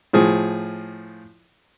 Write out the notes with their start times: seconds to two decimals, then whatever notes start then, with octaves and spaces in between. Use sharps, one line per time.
0.13 A2 F3 G#4